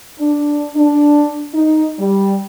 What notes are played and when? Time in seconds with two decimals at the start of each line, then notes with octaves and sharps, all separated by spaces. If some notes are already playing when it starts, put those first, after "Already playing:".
0.20 D4
0.76 D4
1.55 D#4
2.00 G3